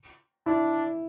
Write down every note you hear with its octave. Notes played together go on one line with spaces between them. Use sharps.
D4 E4